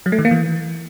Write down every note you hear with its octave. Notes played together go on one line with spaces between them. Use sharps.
F#3
A3
D#3
A#3
E3